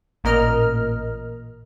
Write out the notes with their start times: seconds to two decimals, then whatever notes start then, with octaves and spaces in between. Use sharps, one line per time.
0.24 A1 A#2 A#4 D#5 F6